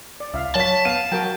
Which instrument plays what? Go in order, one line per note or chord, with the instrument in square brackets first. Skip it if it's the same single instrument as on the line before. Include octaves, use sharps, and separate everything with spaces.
[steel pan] D5
[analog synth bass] C#2 [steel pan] E5 F5
[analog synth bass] F#3 [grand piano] C#5 B6 [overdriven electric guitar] A5
[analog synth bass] B3 [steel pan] F5 [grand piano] D#7
[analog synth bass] F#3 [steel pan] F#4 A#4 G5